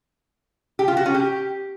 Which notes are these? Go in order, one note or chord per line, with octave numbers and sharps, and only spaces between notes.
G4
F4
F#4
C#4
G4